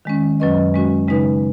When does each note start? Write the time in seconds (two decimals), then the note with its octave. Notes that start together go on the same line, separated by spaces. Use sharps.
0.05 D#3 G#3 C#4
0.40 F#2 F#3 C#4 B4 D#5
0.74 G#3 C#4 F#4
1.08 C#3 G#3 D#4 B4